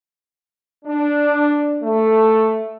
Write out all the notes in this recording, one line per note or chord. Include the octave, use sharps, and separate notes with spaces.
D4
A3